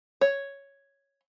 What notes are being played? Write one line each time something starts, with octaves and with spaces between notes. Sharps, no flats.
C#5